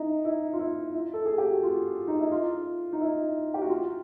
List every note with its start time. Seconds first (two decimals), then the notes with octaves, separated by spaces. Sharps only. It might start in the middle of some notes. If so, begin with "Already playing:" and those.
Already playing: D#4 E4
0.25 E4
0.53 F4
0.59 E4
0.94 E4
1.13 A4
1.26 G#4
1.38 G4
1.50 F#4
1.63 F4
2.07 D#4
2.20 E4
2.32 F4
2.93 D#4
3.01 E4
3.54 G4
3.62 F#4
3.69 F4